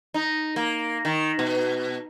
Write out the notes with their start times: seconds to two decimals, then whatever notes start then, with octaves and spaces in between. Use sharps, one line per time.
0.14 D#4
0.56 A#3
1.05 D#3
1.39 B2